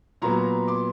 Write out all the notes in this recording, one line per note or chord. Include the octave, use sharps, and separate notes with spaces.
A#2 F#3 B3 A#5 C6
C6 D6